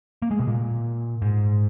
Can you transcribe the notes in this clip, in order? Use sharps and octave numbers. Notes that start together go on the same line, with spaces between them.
A#3
G#3
B2
A#2
G#2